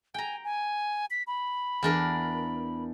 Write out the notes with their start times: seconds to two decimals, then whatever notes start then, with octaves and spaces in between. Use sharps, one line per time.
0.14 G5 G#5 A#5
0.44 G#5
1.11 B6
1.27 B5
1.83 E2 D4 A#4